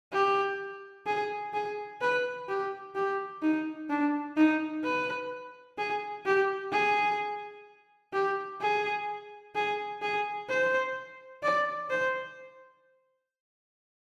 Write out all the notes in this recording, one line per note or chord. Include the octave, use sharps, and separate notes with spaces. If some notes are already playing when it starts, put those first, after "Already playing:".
G4
G#4
G#4
B4
G4
G4
D#4
D4
D#4
B4
G#4
G4
G#4
G4
G#4
G#4
G#4
C5
D5
C5